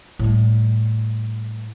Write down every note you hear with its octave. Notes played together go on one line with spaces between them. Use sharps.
A2 G3